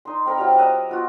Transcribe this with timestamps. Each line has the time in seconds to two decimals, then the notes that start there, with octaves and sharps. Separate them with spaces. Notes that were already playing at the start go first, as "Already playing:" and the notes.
0.05 D#4 C6
0.26 C4 A#4 B5
0.38 F#3 G4 F5
0.58 A#4 B4 D#5 E5
0.89 B3 F4 F#4